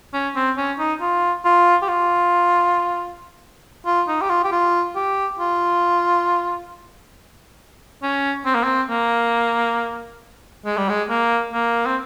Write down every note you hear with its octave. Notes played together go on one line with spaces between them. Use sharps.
C#4
C4
C#4
D#4
F4
F4
G4
F4
F4
D#4
G4
F4
G4
F4
G4
F4
C#4
C4
A#3
C4
A#3
G#3
G3
G#3
A#3
A#3
C4